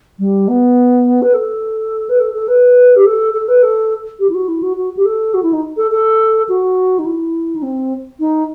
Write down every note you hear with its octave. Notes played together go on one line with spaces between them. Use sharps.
G3
B3
B4
A4
B4
A4
A4
B4
G4
A4
A4
B4
A4
G4
E4
F#4
E4
F#4
F#4
G4
A4
F#4
E4
D#4
A4
A4
F#4
D#4
E4
D#4
C4
D#4